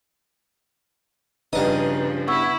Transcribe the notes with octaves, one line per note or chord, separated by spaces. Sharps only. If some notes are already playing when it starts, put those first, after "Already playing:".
G2 C#3 F3 D4 D#4 B4 D#6
B3 E4 C#6 E6